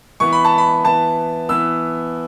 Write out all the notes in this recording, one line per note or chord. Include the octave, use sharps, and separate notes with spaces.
E3 B3 C#6
B5
A5
B5
E3 B3 A5
E3 B3 E6